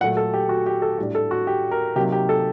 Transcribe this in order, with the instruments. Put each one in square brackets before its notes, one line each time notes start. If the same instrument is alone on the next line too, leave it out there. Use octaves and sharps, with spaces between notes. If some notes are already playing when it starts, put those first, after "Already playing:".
[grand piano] A#2 F#3 A3 F#5
A4
G4
F#4
G4
A4
A2 G3 D4 G4
A4
F#4
G4
A#4
C3 F#3 A#3 D#4 G4
G4
A4